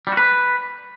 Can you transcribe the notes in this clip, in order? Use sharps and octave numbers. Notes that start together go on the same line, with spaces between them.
G3
F#4
B4